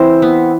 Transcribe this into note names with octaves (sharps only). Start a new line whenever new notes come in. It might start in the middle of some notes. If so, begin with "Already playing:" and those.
Already playing: E3 C4 C5
B3